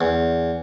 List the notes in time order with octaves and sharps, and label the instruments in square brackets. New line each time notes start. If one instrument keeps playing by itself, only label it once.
[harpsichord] E2